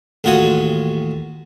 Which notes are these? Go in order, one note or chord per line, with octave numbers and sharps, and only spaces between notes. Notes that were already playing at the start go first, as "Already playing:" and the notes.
A1 D#2 F4 F#4 C#5 D#6